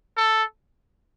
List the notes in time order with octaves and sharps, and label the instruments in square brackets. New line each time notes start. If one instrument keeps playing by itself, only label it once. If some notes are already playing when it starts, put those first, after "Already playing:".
[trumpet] A4